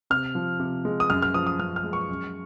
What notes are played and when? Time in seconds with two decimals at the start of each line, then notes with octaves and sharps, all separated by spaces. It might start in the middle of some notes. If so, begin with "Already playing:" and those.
0.10 C3 F6
0.35 F3
0.60 C3
0.85 G#3
1.00 D#6
1.10 F#2 F6
1.22 F6
1.34 F3 D#6
1.46 D#6
1.59 F#2 F6
1.76 F6
1.84 G#3
1.93 C#6
2.10 F#2